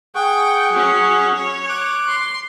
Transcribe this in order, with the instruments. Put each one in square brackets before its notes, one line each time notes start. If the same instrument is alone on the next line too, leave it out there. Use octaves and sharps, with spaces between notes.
[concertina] G#4 F#5 C#6 [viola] G5
[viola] F#3 C#4
C#5
[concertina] D6 F#6
[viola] C6